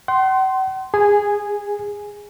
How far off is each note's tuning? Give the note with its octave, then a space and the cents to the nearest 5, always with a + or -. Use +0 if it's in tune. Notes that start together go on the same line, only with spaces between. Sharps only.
F#5 +45 C6 +0
G#4 -15 G#5 +0